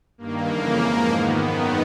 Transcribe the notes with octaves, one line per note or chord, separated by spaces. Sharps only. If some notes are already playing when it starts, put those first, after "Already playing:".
G2 D#3 A#3
F2 C#3 E3
G#2 F3
G#2 D#3 B3
F#2 D#3 B3